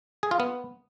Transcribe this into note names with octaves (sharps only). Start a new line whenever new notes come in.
G#4
F4
B3